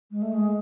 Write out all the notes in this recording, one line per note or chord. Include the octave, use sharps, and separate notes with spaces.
G#3
A3
G#3